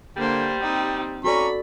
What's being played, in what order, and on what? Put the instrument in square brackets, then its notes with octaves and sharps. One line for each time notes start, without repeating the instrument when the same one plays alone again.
[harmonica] D3 [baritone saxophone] G3 [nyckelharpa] A#3 C5
[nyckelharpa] C4 D#4 [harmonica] G4
[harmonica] C#4 A#5 C#6 [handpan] F#4 A4 D5 [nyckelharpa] B5